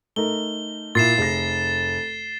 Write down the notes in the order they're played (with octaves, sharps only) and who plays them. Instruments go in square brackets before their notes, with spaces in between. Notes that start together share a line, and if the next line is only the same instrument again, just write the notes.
[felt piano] A3 D#4 A#4 [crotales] G7
[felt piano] A#2 E4 [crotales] A6 C7 E7
[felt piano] F1 G#4 A#6